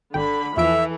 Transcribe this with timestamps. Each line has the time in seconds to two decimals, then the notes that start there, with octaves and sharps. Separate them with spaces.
0.14 G#1 D3 G5 B5
0.57 E2 E3 F3 A4 E5 D7